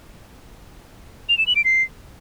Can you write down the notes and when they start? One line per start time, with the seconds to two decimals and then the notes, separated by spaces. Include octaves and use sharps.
1.29 F7
1.38 E7
1.47 F#7
1.56 D7
1.65 C7